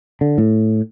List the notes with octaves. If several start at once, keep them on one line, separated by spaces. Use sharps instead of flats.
D3
A2